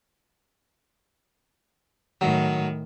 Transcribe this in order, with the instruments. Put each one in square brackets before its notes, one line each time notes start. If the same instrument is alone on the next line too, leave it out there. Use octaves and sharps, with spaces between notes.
[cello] A2 D#3 [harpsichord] F#3